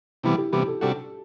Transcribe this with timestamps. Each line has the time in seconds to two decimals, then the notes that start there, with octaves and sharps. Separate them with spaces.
0.24 C3 E3 G3 B3 E4
0.38 G4
0.53 C3 E3 G3 B3 G4
0.67 A4
0.81 C3 G3 D4 F#4 A4